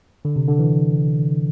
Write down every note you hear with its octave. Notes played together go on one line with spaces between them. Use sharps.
D3
C3
D3
E3